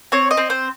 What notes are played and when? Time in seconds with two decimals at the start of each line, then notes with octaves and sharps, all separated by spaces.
0.12 C4 C#5
0.31 D#5
0.37 C4
0.50 C5